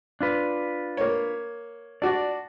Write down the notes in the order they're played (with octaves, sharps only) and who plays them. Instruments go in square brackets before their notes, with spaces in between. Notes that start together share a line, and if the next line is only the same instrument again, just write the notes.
[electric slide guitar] D4 F4 B4
[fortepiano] A#3 C#5
[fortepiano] D4 F#4 [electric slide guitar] D5